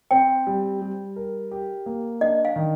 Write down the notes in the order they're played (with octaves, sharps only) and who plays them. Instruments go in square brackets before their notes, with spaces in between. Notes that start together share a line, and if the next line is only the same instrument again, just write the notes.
[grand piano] C4 [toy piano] G5
[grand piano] G3
G3
A#4
G4
A#3
[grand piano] D4 [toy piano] D#5
[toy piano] F5
[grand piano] D#3